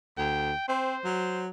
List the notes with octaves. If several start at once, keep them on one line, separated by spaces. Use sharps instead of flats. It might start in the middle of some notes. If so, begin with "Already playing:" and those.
D2 G5
C4 C5
F#3